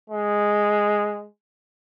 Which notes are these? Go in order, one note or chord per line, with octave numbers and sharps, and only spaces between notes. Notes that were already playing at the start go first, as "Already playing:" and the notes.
G#3